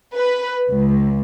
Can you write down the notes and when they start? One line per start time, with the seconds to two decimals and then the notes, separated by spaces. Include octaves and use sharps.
0.15 B4
0.70 C#2